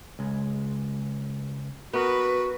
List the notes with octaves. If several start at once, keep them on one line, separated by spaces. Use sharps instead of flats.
C#2 G#3
B3 F#4 A#4 B4